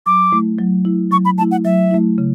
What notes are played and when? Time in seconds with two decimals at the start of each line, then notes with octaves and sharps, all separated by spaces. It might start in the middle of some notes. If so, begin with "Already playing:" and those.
0.06 F#3 D6
0.32 A3 E4
0.59 F#3
0.85 A3 E4
1.11 F#3 C#6
1.25 B5
1.38 A3 E4 A5
1.51 F#5
1.65 F#3 E5
1.91 A3 E4
2.18 C#3